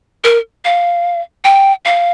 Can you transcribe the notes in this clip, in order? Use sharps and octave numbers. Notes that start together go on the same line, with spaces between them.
A#4
F5
G5
F5